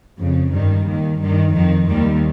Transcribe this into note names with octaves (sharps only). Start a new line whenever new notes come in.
F2 C#3
G2 D#3 G3
D#2 D#3
G2 D#3
F2 D#3 F3
D#2 D#3 G3